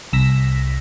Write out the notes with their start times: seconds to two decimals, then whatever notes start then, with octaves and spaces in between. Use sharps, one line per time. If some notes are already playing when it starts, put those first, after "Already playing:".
0.13 C2 E6 A#6 B6